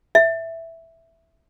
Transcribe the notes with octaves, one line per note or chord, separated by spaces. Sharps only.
E5